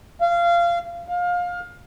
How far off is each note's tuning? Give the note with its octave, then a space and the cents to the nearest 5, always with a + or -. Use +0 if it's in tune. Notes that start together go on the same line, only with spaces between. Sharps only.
F5 -20
F5 +25